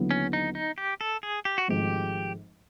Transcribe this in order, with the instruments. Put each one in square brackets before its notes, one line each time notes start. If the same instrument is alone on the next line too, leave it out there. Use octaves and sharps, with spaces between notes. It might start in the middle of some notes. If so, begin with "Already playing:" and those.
Already playing: [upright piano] D#2 D3 F#3 B3 E4
[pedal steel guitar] C#4
D#4
D#4
G4
A4
G#4
G4
F#4
[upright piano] G#1 G#2 F3 A3 [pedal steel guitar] G4